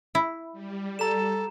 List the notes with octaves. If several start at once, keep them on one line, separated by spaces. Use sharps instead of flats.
E4
G3
A4 A#5 E7